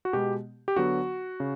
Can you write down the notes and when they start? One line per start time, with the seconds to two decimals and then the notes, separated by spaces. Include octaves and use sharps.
0.05 F#4
0.13 B2 G#3 B3 G4
0.68 G4
0.76 D3 F#3 B3 F#4
1.40 C#3